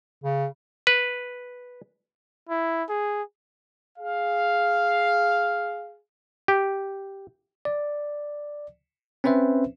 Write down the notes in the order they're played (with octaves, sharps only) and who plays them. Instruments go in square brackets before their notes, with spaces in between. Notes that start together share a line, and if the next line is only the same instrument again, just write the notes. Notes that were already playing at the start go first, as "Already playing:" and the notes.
[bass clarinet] C#3
[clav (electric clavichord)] B4
[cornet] E4
G#4
[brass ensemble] G#4 F5
[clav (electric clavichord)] G4
[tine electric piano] D5
C4 C#4 B4 C5 E5